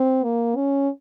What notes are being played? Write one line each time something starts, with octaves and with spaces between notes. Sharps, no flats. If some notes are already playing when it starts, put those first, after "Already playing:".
Already playing: C4
A#3
C#4